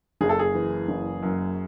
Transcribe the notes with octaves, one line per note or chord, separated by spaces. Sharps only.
F#1 G#4
A4
G#4
E3
F#1
F#2